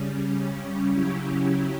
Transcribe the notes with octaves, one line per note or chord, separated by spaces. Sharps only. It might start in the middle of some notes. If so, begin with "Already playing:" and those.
Already playing: C#3 G3 C#4
C#3 F#3 C#4 E4 G4